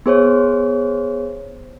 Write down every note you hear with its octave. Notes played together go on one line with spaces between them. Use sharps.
B3 G#4 C5 C#5